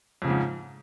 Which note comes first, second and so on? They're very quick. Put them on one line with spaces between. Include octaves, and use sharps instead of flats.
F2 C#3 F3 G#2